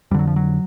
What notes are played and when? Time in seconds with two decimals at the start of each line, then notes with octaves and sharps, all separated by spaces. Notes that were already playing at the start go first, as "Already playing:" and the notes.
0.11 F2 G3
0.14 D3 F#3
0.27 F3
0.36 F#3